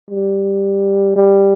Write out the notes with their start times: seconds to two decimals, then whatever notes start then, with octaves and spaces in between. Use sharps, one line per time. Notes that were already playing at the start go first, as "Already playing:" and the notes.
0.10 G3
1.16 G3